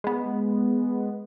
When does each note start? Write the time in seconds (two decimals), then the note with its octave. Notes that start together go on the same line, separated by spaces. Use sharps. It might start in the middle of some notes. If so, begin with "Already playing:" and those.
0.04 G#3 B3